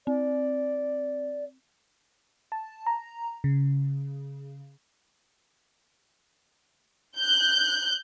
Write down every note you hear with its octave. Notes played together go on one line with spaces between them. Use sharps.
C4 D5
A5
A#5
C#3
F#6 G6